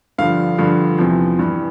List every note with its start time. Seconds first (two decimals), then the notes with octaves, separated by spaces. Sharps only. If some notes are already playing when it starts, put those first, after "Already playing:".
0.18 G2 D3 F3 F5
0.58 G2 D3 F3
0.98 E2 C3 F3
1.39 G2 E3